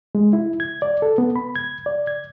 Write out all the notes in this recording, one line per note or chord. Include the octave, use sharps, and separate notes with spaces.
G#3
E4
G#6
D5
A4
B3
B5
G#6
D5
G#6